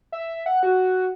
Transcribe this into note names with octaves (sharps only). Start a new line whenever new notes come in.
E5
F#5
F#4